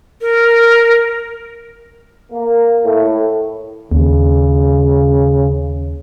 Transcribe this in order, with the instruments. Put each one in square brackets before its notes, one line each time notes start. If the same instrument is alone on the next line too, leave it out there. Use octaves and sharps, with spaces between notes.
[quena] A#4
[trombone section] A#3
A2
[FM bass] D#2 [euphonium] C#3